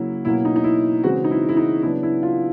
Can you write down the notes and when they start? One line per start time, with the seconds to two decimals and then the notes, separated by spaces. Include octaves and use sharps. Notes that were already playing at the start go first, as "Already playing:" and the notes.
Already playing: C#3 F#3 A#3 E4
0.25 B2 F#3 A#3 C#4 E4
0.45 D#4
0.56 D#4
0.64 E4
1.04 C#3 E3 G#3 C4 F#4
1.24 D#4
1.31 E4
1.49 E4
1.57 D#4
1.83 C#3 F#3 B3 D4 E4
2.03 E4
2.23 F4